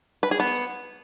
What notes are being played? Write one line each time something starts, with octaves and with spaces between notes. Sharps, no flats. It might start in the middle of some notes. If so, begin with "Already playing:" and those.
B4
G#4
B3